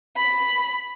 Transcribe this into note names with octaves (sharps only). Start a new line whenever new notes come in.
B5